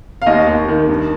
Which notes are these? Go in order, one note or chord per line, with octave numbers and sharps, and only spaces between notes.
F5
D#2 D#5
D#2
D#3
G2